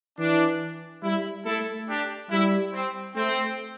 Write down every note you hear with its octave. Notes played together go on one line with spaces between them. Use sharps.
E3 D4
G3 E4
A3 E4 A4
D4 G4
G3 E4
C4
A3 C4